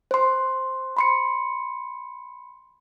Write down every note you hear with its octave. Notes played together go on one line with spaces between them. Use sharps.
C5 C6
B5 C6 C#7